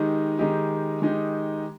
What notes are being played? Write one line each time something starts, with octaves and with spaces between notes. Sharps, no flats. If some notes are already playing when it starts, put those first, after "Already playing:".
Already playing: D#3 G#3 D#4 G4
D#3 G#3 D#4 G4
D#3 G#3 D#4 G4